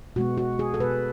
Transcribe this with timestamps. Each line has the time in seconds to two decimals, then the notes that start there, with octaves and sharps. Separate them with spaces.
0.16 B2 G#3 B3 F#4
0.38 F#4
0.59 G#4
0.74 A4
0.79 B2 G#3 B3 B4